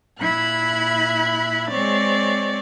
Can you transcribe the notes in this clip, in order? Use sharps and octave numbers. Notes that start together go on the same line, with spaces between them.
A#2 E4 B5 F#6 G#6
G#3 C4 C#5 D5